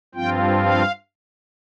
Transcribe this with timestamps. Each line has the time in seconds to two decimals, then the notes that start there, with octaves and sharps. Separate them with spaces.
0.15 G2 F3 C4 F4 G5
0.63 F5